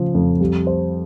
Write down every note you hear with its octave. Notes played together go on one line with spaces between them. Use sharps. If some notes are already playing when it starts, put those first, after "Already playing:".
Already playing: C#3 F3
F2
G3
C5